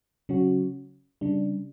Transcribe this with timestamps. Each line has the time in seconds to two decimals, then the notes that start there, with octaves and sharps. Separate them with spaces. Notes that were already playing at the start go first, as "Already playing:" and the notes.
0.29 C#3 F#3 C#4 F#4
1.21 C#3 G3 D4